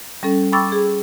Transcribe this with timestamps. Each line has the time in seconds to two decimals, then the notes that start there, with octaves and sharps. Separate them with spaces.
0.23 G3 C#4 A4
0.52 G5 B5 C#6 D6 E6 A6
0.72 G#4